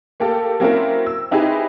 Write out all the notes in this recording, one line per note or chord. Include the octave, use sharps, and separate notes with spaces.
A3 A#3 G4 A4
F#3 A#3 C4 C#4 E4 A#4
E6
C4 D#4 E4 G4 G#4 B4